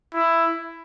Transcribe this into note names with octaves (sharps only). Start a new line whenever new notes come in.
E4